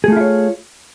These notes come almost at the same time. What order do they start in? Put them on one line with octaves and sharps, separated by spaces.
G#4 A3 F4 E4 C#5